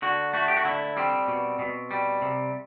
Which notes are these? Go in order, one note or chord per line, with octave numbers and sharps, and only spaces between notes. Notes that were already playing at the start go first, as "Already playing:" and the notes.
D3 F#4
A3 F#4
G4
F#4
D3 E4
G3 C4
B2
B2
G3
C3